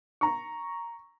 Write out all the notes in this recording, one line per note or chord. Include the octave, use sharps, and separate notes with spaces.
A#5 C#6